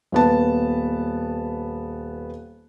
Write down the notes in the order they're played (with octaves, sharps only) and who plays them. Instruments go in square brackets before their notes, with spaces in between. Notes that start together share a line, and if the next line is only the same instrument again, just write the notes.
[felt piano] D#1 B3 A5